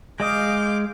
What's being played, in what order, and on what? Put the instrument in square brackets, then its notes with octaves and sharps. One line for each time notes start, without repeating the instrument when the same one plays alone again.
[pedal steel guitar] G#3 D#5 D#6 [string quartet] F5 D6 G6